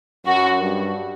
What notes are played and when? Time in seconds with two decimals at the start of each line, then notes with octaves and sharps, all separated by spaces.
0.25 F#2 F#4
0.60 G2